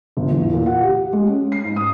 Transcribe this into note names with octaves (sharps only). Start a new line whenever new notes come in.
G1
E2
A#2
F#5
G4
G#3
C#4
C7
G#2
D#6